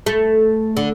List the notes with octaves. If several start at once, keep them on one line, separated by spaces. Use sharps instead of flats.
A3
D3